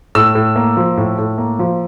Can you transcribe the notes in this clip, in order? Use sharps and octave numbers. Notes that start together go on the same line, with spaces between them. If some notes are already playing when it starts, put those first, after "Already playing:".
A2 E6
A2
A#3
F3
A2
A2
A#3
F3